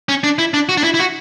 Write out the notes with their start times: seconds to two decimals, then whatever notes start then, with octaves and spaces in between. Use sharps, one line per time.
0.09 C#4
0.24 D4
0.39 E4
0.54 D4
0.69 F#4
0.77 D4
0.84 E4
0.94 E4
0.99 F#4